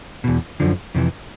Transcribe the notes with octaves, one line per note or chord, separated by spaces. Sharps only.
E2 B2
F#2 D3 F3
F2 C3 E3